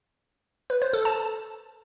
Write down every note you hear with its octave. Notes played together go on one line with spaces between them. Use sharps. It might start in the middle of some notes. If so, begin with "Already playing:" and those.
B4
C5
A4
A5